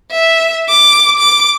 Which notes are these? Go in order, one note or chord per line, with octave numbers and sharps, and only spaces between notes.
E5
D6
D6